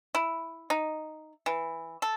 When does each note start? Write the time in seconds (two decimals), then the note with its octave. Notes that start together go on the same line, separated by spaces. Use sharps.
0.15 E4
0.70 D#4
1.46 E3
2.02 A4